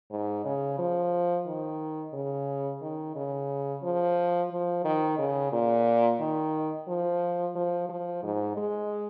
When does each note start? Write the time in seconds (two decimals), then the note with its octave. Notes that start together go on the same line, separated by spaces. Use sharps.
0.10 G#2
0.45 C#3
0.78 F3
1.46 D#3
2.14 C#3
2.82 D#3
3.15 C#3
3.83 F3
4.51 F3
4.84 D#3
5.18 C#3
5.52 A#2
6.20 D#3
6.88 F3
7.55 F3
7.89 F3
8.23 G#2
8.57 G#3